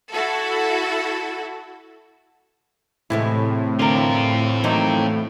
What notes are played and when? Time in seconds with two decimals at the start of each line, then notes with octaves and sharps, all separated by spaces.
0.11 E4 F#4 A4
3.10 A2 C3 E3 G#3 A3 E4
3.79 D3 C4 F4 A#4
4.64 E3 F#3 A3 A#3 D#4 C5